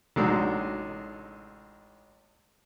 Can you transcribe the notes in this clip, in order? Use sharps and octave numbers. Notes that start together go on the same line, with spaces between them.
A1 C3 G#3 D4 D#4 F#4